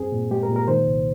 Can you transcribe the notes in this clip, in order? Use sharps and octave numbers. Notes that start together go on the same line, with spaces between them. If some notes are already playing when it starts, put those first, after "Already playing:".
Already playing: G2 C4 G#4
A#2
G#3 G4
A#4
A#2
A#4
D#3 C5
C2